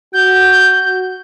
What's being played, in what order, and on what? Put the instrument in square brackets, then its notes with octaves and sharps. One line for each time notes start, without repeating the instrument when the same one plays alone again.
[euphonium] F#4 [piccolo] G6